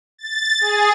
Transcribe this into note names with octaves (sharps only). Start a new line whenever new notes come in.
A6
G#4